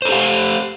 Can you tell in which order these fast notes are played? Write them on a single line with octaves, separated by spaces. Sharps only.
C5 A4 G4 F5